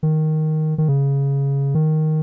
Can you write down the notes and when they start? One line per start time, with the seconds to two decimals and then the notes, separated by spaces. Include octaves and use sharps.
0.03 D#3
0.78 D#3
0.89 C#3
1.75 D#3